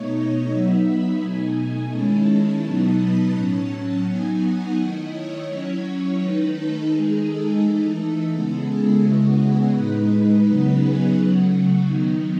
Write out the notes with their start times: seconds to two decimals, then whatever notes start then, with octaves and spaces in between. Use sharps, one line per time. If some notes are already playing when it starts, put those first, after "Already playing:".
Already playing: B2 A3 D#4 C#5
0.14 D#5
0.49 F#3 B3 D#4 E5
0.85 B5
1.20 B2 A3 D#4 G#5
1.56 G#5
1.92 D#3 G#3 C#4 E4 A5
2.27 A5
2.62 B2 F#3 B3 D#4 A5
2.97 B5
3.33 A2 F#3 C#4 A5
4.05 F#3 B3 D#4 G#5
4.40 F#5
4.76 D#3 A3 E4 D#5
5.11 C#5
5.47 F#3 C#4 E4
6.18 D#3 A3 D#4 B4
6.53 A4
6.89 D#3 G#3 D#4 G#4
7.24 A4
7.60 E3 A3 D#4 A4
8.31 C#3 G#3 B3 E4
8.67 G#4
9.02 C#3 G#3 B3 E4 F#4
9.38 G#4
9.73 A2 G#3 D#4 B4
10.44 C#3 F#3 B3 D#4 B4
10.80 G#4
11.15 C#3 F#3 A3 F#4
11.50 F#4
11.87 D#3 F#3 B3 D#4